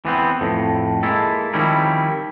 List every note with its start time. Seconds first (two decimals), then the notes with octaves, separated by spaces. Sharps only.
0.05 E3 B3 C4
0.41 F2 A2
1.03 G#3 A#3 E4 A4
1.54 D#3 F3 G3 C4 C#4 E4